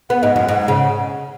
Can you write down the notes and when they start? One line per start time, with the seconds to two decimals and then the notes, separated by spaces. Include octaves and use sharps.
0.10 B3 F#5
0.22 G#2 D#5
0.36 F#2 F#5
0.48 G#2 F#5
0.61 F#5
0.68 C#3